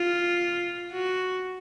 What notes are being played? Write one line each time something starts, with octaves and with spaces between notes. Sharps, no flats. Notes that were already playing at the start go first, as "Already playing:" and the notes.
Already playing: F4
F#4